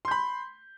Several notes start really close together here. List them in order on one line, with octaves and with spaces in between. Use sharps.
C6 G6 B5